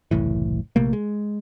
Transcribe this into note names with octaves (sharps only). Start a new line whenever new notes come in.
F#1 C2 A2 E3
A#1 C3 A3 A#3
G#3